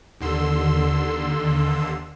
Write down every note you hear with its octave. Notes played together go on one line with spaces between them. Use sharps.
D#2 D3 C6 E6